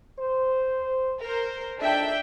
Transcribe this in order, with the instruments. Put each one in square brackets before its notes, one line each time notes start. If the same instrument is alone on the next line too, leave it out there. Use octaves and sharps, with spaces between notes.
[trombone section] C5
[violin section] A#4 C5
[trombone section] A#1 D#4 A4 [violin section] D4 E5 G5